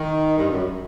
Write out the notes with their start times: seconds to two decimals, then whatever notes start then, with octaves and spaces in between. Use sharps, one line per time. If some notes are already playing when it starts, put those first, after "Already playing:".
Already playing: D#3
0.38 G2
0.51 F#2